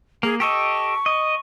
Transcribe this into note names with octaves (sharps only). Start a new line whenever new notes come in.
A#3 G#4
G4 A4 D#5 C#6
D#5